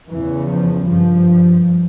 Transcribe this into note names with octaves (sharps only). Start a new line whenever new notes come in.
E2 C#3 E3
F3
G2 F3